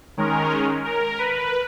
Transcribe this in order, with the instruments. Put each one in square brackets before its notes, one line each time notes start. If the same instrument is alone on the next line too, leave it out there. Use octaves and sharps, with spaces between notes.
[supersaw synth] D#3 G#3 C#4 A#4
A#4
B4